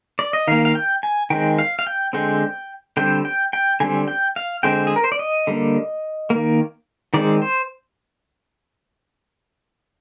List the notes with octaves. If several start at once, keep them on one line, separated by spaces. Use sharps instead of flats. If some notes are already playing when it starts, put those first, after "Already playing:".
D5
D#5
D#3 A#3 F5
F5
G5
G#5
D#3 G#3 C4 G5
F5
F5
G5
D3 G#3 C4 G5
D3 G3 C4 G5
G5
G5
D3 G3 C4 G#5
G5
F5
D3 G#3 C4 G5
G#4
A#4
C5
D5
D#5
D3 G3 A#3
D#3 A#3
D#3 G#3 C4 D5
C5